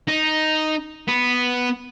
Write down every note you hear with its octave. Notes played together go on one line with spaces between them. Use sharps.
D#4
B3